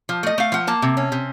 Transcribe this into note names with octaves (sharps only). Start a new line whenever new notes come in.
F3
A3 D#5
A3 F5
F3 F#5
A#3 A5
C3
C#4
C3